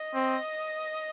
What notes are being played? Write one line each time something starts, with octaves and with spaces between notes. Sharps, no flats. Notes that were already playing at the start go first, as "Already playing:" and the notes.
Already playing: D#5
C4